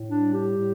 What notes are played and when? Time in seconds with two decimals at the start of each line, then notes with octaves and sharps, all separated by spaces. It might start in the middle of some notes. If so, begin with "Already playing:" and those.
Already playing: A2
0.10 G3 D4
0.33 G4
0.57 A2